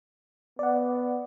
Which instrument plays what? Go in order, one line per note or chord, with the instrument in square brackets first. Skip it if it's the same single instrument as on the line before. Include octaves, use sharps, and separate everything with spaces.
[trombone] B3 [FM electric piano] D5 F#5